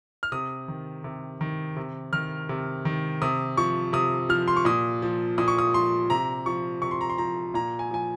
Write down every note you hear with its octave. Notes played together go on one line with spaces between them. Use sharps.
F6
C3 D#6
D#3
C3
D#3
C3
D#3 F6
C3
D#3
C3 D#6
F3 C#6
C3 D#6
F3 F6
C6
C#6
A#2 D#6
F3
A#2 D#6
C#6
D#6
F3 C6
C3 A#5
F3 C#6
C3 C#6
C6
A#5
C6
F3 A#5
A#2 A#5
G#5
F3 G#5